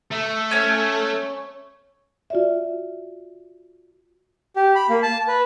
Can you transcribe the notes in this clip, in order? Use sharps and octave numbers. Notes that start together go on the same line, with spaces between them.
A3
C#4 C#5
F4 F#4 D5 E5
G4
B5
A#3
A5
B4